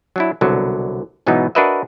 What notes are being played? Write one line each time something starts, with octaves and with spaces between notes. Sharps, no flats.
F#3 D4 E4
C2 B2 D3 F#3
G#2 B2 E3 F#3 B3 D#4
D4 F#4 A#4 B4 D#5 E5